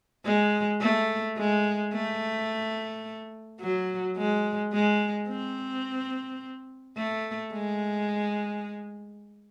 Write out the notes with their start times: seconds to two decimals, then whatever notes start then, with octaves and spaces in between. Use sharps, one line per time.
0.25 G#3
0.81 A3
1.38 G#3
1.93 A3
3.61 F#3
4.17 G#3
4.73 G#3
5.29 C4
6.97 A3
7.53 G#3